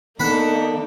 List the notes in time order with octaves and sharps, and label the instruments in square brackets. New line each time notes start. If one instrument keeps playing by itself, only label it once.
[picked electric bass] D#3 B3 [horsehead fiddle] A#3 D#4 [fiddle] D4 A4 [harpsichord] F#5 B5